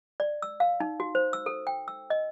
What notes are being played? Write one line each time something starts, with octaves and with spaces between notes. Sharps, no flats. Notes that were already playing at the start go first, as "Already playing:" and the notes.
D5
E6
F5
D#4
F#4
C5
E6
A4
G5
E6
D#5